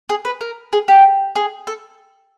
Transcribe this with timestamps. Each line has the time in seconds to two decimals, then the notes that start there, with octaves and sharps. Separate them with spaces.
0.09 G#4
0.25 B4
0.41 A#4
0.73 G#4
0.88 G4
1.36 G#4
1.67 A4